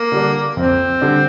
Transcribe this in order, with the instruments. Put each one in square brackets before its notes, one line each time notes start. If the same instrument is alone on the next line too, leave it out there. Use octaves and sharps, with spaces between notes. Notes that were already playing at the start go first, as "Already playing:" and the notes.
Already playing: [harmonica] A#3
[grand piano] D3 G3 D4
[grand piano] F2 [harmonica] C4
[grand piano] D3 G3 D4